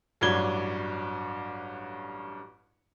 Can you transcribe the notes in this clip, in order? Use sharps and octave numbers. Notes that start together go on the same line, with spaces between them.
A1 G2 F#3 D4 G#6 G7